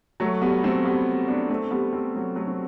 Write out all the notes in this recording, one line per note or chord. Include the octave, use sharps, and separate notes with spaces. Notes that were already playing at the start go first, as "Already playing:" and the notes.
F#3 A3
G3 B3
A3 C4
G3 B3
B3 D4
A3 C4
G3 B3
A3 C4
F#3 A3
F#3 A3
C4